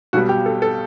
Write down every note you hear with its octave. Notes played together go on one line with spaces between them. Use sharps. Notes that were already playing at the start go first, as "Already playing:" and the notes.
B1 B2 G3 F#4
G4
A4
A4